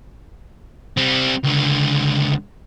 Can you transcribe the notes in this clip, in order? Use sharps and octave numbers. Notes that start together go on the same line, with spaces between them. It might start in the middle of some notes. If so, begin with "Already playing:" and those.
G3 C4
C#2 D3